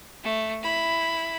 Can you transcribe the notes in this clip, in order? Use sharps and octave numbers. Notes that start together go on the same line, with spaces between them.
A3
E4 B5